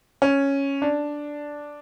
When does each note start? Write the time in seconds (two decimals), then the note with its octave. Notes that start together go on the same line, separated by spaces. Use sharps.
0.22 C#4
0.82 D4